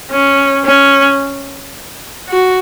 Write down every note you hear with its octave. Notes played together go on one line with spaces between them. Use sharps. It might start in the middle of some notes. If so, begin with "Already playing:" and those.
C#4
C#4
F#4